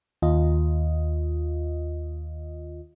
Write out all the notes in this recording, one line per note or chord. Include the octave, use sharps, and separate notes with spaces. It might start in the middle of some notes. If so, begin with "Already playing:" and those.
D#2 F4 D#5